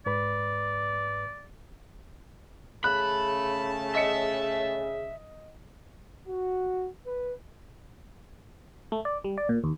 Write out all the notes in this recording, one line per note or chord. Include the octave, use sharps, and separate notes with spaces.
G#2 B4 D5 B5
C#3 A3 A5 B5 F#6
D#5 E5 C#7
F#4
B4
A3
D5
G3
D5
A#2
D#2